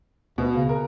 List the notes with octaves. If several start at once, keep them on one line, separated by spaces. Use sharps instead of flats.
D2 B2
C#3
A#4